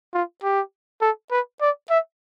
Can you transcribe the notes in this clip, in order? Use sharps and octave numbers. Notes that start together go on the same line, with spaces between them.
F4
G4
A4
B4
D5
E5